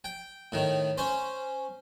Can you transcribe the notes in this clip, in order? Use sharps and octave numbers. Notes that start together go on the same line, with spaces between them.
G5
A2 D#3
C#4 C5